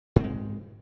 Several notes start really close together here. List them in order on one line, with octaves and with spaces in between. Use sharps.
G#2 C4 G#3